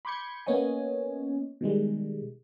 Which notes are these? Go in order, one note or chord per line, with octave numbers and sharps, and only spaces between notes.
B5 C6 D6 G6 G#6 C#7
A#3 B3 C#4 C#5 D#5 G#5
B2 D#3 G3 G#3